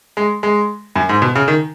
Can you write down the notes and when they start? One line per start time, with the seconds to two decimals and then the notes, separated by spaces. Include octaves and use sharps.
0.17 G#3
0.43 G#3
0.96 F#2
1.09 G#2
1.22 B2
1.35 C#3
1.48 D#3